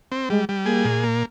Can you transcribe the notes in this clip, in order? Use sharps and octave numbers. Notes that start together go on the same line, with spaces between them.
C4
G3 G#3
G3
A#3 G#4
A#2
A#3